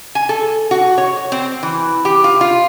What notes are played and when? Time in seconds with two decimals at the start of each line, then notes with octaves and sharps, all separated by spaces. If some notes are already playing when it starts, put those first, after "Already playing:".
0.15 G#5
0.29 A4
0.71 F#4
0.98 C#5
1.32 C4
1.63 E3
2.05 G4
2.24 F4
2.41 F4